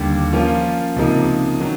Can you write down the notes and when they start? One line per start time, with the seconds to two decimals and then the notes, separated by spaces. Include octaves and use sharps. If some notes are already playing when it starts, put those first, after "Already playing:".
Already playing: D#2 D3 G3
0.33 F3 A#3 C#4 F4
0.96 C#2 C3 F3 A#3 D#4
1.60 D#3 F#3